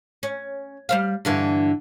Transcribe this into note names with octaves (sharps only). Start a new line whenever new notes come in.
C#4
G3 C5 F5
G2 D3 E3